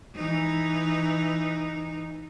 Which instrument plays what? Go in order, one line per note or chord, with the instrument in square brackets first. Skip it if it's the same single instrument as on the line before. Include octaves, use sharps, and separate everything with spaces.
[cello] E3 D#4